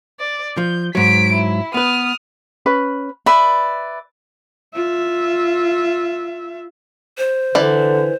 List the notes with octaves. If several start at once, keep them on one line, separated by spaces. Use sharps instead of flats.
D5
F3 G6
G#2 F#3 B6 D7
E4
B3 B4 D#6 F6
C#4 B4 B5
B4 D5 E5 B5
F4 E5
C5
D3 E3 D5